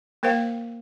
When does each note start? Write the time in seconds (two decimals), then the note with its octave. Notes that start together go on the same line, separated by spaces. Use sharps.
0.23 A#3 A#4 C5 F5 G5